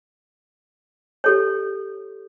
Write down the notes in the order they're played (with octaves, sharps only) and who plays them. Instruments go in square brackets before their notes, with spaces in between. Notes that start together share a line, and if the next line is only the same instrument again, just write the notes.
[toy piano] G4 A4 C#5